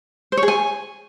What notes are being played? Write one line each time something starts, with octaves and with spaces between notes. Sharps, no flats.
C5
C#5
G#4
G#5